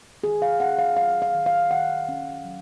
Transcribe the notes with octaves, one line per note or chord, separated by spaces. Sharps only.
D#3 G#4
F5
C#4 F#5
F5
F#3 F5
F5
D#3
F5
D#3 F#5
C#4
F#3